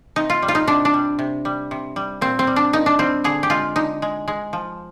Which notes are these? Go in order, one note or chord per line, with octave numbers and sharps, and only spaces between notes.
C3 D#4
F4
G3
F4
D#4
C3 D4
D4
G3
C3
G3
C3
G3
A#2 C4
C4
G3
D4
A#2 D#4
D4
G3 C4
D3 G#4
G4
G#3 F4
D3 D#4
G#3
G#3
F3